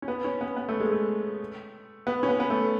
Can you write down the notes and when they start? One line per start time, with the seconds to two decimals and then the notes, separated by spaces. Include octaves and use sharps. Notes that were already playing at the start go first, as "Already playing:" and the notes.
0.02 C#4
0.08 B3
0.24 C#4
0.41 B3
0.56 B3
0.69 A3
0.80 G#3
0.91 A3
2.07 B3
2.23 C#4
2.29 B3
2.40 B3
2.50 A3